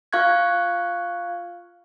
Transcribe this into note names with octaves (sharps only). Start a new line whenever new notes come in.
F4 F5 C#6 F#6 G#6